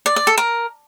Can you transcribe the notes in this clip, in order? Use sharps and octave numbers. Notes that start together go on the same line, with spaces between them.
D5
D5
A4
A#4